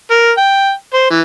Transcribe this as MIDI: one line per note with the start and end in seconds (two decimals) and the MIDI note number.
0.11 0.31 70
0.38 0.72 79
0.94 1.09 72
1.10 1.21 52